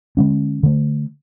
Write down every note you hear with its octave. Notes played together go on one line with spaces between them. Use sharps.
D3 G#3 C#4
D3 A3